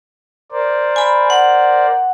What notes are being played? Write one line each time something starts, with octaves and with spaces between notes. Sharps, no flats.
A#4 C5 D5
G#5 B5
F#5